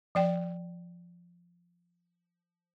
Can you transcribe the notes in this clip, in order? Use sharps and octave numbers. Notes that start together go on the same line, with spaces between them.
F3 D5 G5